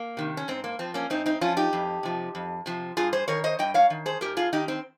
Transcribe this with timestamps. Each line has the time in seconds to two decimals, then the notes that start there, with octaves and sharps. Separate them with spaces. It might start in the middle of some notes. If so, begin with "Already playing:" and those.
Already playing: A#3
0.17 C3 D#3
0.37 C#4
0.48 G#2 C4
0.64 A#3
0.79 F3 C4
0.94 A#3 C#4
1.10 G#2 C4 D#4
1.26 C4 D#4
1.41 F3 C#4 F4
1.57 D#4 G4
1.73 F2
2.03 C3 F3
2.35 F2
2.66 C3 F3
2.97 G2 F4 G#4
3.13 G#4 C5
3.28 D#3 A#4 C#5
3.44 C5 D#5
3.59 G2 D#5 G5
3.74 C#5 F5
3.90 D#3
4.06 G#4 C5
4.21 G#2 G4 A#4
4.37 F4 G#4
4.53 D#3 D#4 G4
4.68 C4